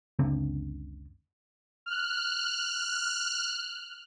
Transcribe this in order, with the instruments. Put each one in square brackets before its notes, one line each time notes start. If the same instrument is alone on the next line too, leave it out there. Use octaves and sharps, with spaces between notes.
[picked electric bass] F#1 C#2 D3 C4
[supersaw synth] F6 F#6